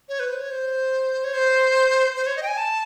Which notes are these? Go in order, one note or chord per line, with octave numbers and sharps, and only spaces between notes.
C#5
B4
C5
C#5
C5
C#5
C5
C5
C#5
D#5
G5
G#5
A5